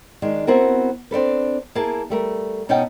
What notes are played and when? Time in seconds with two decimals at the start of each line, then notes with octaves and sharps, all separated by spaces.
0.22 D#3 G#3 D4
0.47 B3 C4 E4 F#4 A#4
1.11 C4 D4 A4 B4
1.75 A#3 E4 G#4 G#5 A5
2.10 G3 A3 A#4
2.69 B2 C#4 D#4 F#5 G5 A5